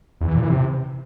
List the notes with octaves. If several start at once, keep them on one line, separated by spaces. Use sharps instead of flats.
E2
E3
A#2
E3
C3